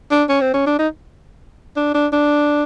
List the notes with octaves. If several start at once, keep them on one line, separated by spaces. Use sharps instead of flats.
D4
C#4
C4
C#4
D4
D#4
D4
D4
D4